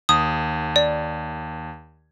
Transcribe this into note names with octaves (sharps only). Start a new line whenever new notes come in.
D#2 D#6
D5